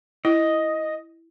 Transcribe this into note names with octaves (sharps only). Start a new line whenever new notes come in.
E4 D#5